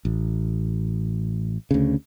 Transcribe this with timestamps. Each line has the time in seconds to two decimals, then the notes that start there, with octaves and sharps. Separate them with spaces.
0.05 A1
1.71 D2 C#3